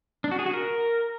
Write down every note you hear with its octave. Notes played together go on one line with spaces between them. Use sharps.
D4
F#4
G#4
F#4
A#4